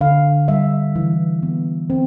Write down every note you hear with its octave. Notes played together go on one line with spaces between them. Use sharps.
D3 F5
G3 E5
E3
B3
C4